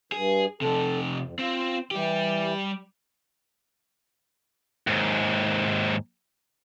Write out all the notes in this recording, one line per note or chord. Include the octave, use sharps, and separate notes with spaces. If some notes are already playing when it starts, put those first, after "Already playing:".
G2 G#4
C3 F3 A4
F2
C4 F4
E3 G3 G4
D#2 G#2